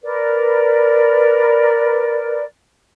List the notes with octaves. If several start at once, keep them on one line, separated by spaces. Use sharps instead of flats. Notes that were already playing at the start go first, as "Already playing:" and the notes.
A#4 B4 D5